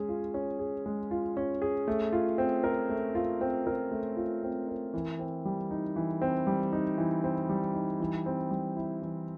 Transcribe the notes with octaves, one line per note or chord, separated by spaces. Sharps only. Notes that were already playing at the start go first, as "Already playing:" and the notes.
Already playing: G#3 C#4 G#4
F4
C#4
G#4
G#3
F4
C#4
G#4
A3
F4
C4
A#4
A3
F4
C4
A#4
A3
F4
C4
A#4
E3
C4
G3
D#4
E3
C4
G3
D#4
E3
C4
G3
D#4
E3
C4
G3
E4
E3